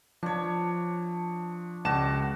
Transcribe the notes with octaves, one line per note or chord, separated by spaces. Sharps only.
F3 D4 C#5
C#2 F#4 D5 A5 E7